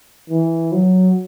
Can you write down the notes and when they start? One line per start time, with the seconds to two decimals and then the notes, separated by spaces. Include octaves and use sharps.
0.30 E3
0.72 F#3